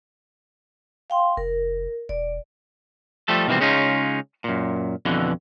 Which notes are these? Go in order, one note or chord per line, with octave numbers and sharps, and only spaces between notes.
F5 G5 C6
F1 A#4
E1 D5
F3 G3 A3 A4
B2 D#3 E3 G3 C4
C#3 G#3 C#4 D#4 F4
F#2 A#2
F2 B2 D3 E3